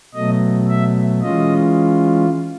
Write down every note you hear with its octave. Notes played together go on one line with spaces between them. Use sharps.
B2 F#3 A3 D#5
E5
E3 G#3 C#4 F4 D#5